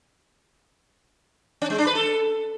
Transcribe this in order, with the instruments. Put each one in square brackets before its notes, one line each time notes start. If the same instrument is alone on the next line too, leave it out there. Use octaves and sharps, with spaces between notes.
[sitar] C#4
G#3
D4
B4
A4